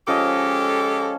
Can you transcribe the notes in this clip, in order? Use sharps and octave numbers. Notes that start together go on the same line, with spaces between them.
F3 G#3 C#4 G4 A4 D#5